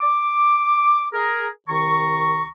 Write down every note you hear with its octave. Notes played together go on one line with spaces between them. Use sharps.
D6
G#4 A#4
C2 D#3 A#5 C#6